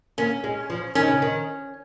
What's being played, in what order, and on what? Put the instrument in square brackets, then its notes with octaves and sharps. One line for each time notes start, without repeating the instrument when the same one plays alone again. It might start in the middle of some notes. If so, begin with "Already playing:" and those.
[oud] A#3 [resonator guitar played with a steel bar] C#4
[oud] G#3
F3
[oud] D#3 [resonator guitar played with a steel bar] C#4
[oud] C#3
D#3